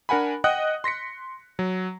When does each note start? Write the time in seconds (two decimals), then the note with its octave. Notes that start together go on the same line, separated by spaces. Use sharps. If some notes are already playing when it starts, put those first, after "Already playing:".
0.09 D4 A#4 F#5 G#5 B5
0.44 D#5 F#5 G5 D#6 F#6
0.84 C6 A#6 B6 C#7
1.59 F#3